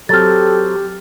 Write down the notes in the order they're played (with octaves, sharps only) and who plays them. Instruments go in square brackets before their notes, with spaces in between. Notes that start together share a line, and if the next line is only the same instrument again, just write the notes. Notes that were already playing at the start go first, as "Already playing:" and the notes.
[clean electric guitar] F#3 C4 [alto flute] G4 [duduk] A4 [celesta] F6 A6